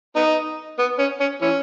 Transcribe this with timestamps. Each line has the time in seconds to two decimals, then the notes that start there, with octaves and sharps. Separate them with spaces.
0.16 B3 D#4
0.79 B3
0.99 C#4
1.20 C#4
1.41 E3 C#4